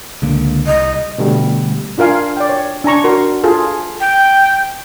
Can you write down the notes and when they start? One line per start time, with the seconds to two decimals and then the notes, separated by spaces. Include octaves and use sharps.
0.22 C#2 D3 A#3
0.67 C2 D#5
1.18 B2 D3 G3 A3
1.98 D4 F4 A#4 F5 G#5
2.37 D5 G5
2.49 C#5
2.84 D4 G#5 A#5 C#6
3.04 F#4 A#4 C6
3.44 F4 G#4 A4
4.00 G5